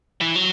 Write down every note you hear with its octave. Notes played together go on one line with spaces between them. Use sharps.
E3
F#3